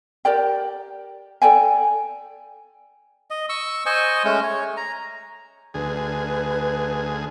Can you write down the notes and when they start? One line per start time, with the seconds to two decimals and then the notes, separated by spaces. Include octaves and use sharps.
0.25 G4 A#4 D5 G5
1.42 A4 D5 G5 G#5
3.30 D#5
3.49 C#6 E6
3.86 C5 D#5 G#5 C#6
4.24 G#3 A3 C#4
4.43 C#5
4.77 A#5
5.74 D2 G#4 B4